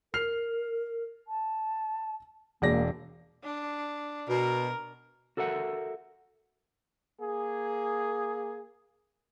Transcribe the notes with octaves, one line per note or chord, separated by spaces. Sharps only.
A#4 F6 C7 F7
A5
E1 A#3 D5 A#6
D4
B2 A#4
F#4 A4 A#4 E5 F#5
A#3 G#4